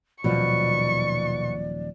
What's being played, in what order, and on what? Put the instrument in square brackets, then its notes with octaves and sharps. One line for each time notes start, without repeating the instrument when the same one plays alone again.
[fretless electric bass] D#1 F3 F#3 [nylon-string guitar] B2 [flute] D5 [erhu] C#6